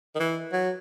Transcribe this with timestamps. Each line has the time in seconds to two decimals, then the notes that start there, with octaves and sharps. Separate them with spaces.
0.15 D#3
0.20 E3
0.52 F#3